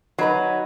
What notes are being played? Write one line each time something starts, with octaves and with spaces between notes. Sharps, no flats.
F#3 D#4 B4 D#5